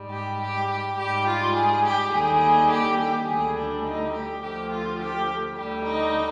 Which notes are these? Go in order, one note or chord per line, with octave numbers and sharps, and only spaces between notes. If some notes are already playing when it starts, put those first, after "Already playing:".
Already playing: G#2 G3
G4
G4
G4
G#2 G3 G4
F4
G#4
G4
D#2 D3 G3 G#4
G4
G4
D2 D3 G3 G#4
D4
D#4
G4
D2 D3 F3 G4
F4
G4
D2 D3 G3 G4
D#4